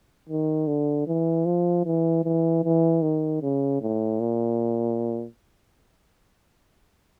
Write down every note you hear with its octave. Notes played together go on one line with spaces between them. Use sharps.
D#3
D3
E3
F3
E3
E3
E3
D#3
C#3
A2
A#2